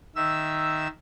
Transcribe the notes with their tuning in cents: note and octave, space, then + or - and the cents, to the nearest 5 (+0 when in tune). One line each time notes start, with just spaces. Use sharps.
D#3 +0 E5 +0 E6 +0